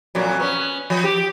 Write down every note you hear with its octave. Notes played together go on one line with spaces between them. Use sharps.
F2 A#2 F#3
B3 C#4
F3
G4